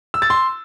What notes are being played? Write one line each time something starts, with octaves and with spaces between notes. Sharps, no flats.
E6
A6
C6